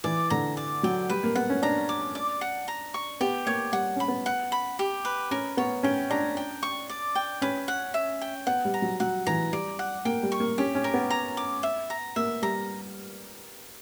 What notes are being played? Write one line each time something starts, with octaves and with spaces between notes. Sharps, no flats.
E3 D5
D3 A#5
D5
F#3 G5
G3 B4
A#3
B3 F#5
C#4
D4 A#5
D6
D5
F#5
A#5
C#6
B3 G4
A#3 C#5
G3 F#5
C#4 B5
B3
F#5
B5
G4
B4
C#4 A#4
B3 C#5
C#4 G5
D4 A#5
G5
C#6
D5
G5
C#4 B4
F#5
E5
G5
B3 F#5
G3
A#5
F#3
F#3 F#5
E3 A#5
G3 D5
F#5
A#3 G5
G3
C#6
A#3
C#4 G4
C#4
A#4
B3
A#5
D6
E5
A#5
A#3 E5
G3 A#5